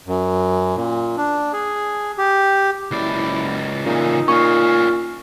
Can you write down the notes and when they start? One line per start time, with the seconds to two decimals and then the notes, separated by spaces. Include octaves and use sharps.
0.07 F#2
0.76 A#2
1.17 D4
1.53 G#4
2.18 G4
2.91 F#1 C#2 E4 D5
3.86 A#2 C#3 E3 D#4
4.28 A#2 C#4 F4 C#6